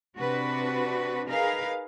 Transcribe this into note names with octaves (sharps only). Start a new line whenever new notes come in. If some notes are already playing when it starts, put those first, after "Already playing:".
C3 D4 F#4 B4
D#4 G#4 A#4 B4 F5